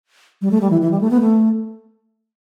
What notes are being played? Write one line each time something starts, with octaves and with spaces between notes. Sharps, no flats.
G3
A3
G3
E3
E3
G3
A3
B3
A3